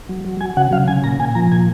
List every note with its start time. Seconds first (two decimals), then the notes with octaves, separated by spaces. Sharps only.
0.09 F#3
0.25 F#3
0.41 F#3 G#5
0.57 C#3 F#5
0.72 C#3 F5
0.88 C#3 G#5
1.04 A#2 A#5
1.20 A#2 G#5
1.35 F3 A#5
1.52 A#2 G#5